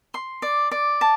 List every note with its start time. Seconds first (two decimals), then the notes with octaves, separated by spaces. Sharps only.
0.14 C6
0.42 D5
0.71 D5
1.01 A5